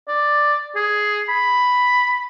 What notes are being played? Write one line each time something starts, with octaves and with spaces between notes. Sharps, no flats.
D5
G#4
B5